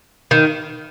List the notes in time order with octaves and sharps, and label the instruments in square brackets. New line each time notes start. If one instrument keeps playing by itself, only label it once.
[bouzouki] D#3